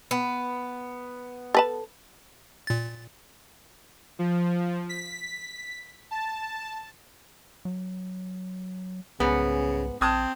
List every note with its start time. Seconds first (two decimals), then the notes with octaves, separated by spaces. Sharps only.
0.11 B3
1.55 A4 B4 A5
2.67 A#2 A6
4.19 F3
4.89 B6
6.11 A5
7.65 F#3
9.20 C2 G#2 C#3 B3
10.01 A#1 C4 A5 D#6 G#6